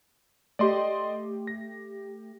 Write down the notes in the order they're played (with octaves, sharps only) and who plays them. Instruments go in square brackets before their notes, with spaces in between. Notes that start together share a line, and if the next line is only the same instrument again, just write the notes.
[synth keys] A3 G4 [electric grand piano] D5 D#5 C6
[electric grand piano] A#6